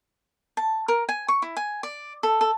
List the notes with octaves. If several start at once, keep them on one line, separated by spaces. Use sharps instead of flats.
A5
A#4
G#5
C#6
E4
G#5
D5
A4
A4